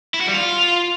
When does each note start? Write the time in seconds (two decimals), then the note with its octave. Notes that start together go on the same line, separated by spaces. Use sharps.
0.14 E4
0.21 F#4
0.28 G3
0.34 F4